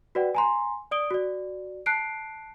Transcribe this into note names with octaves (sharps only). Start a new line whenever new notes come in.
F#4 B4 D5 F#5 G5
G#5 A#5 C6
D5 D#6 D7 G7
F#4 D5
A5 F#6 C7 D7